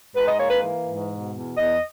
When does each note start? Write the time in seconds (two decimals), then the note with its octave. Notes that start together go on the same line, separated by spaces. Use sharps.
0.15 G#2 B4
0.28 D#5
0.38 A#3 C#5
0.50 B4
0.63 E3
0.86 G#2
1.10 B2
1.34 E2
1.57 E2 D#5